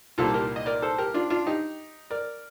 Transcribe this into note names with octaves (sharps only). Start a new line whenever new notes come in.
C2 A#2 G3 F4 A4
G4 A#4
D#5
A#4 D5
A4 C5
G4 A#4
D4 F4
D4 F4
D#4 G4
A#4 D5